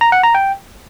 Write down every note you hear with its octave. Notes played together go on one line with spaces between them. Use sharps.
A#5
F#5
A#5
G5